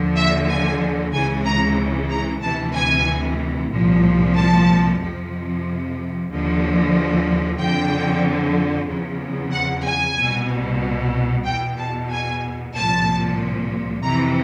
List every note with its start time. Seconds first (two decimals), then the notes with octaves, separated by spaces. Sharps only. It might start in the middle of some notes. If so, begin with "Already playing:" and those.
Already playing: D#2 D3 F3
0.16 E5
0.48 G#5
1.12 C#2 C#3 E3 G#5
1.45 A#5
2.10 A#5
2.42 D2 C3 E3 A5
2.74 G#5
3.71 C2 A#2 F3
4.35 A5
5.00 F2 C3 F3
6.29 D#2 D3 F3
7.58 F2 D3 F3 G5
8.87 E2 C#3 F3
9.52 F#5
9.84 G#5
10.16 C2 B2
11.45 E2 B2 G5
11.77 A5
12.10 G#5
12.74 C2 A#2 F3 A5
14.03 F2 C3 E3 A#5